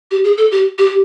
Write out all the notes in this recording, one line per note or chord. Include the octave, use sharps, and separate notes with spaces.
G4
G#4
A4
G4
G4